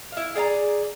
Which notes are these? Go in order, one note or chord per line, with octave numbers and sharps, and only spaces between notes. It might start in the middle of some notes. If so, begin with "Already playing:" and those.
E4 F5
G#4 D5 G5 A#5